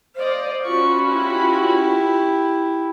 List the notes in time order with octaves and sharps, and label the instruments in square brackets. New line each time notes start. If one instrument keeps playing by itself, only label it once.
[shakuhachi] C5 [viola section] D5 D#5 F5
[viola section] C#4 F#4 B5 [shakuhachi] F4 [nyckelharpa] C#6
[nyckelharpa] E4 G4